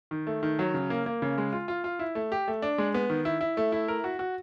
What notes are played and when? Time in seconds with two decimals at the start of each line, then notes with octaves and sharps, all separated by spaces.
0.11 D#3
0.27 A3
0.43 D#3
0.59 F#3
0.74 C#3
0.90 A#3
1.06 A#3
1.22 C#3
1.38 G#3
1.53 F4
1.68 F4
1.84 F4
1.99 E4
2.15 A3
2.32 G4
2.48 A3
2.62 D4
2.78 G#3
2.94 B3
3.10 D#3
3.25 E4
3.41 E4
3.57 A3
3.72 E4
3.88 A#4
4.04 F#4
4.19 F#4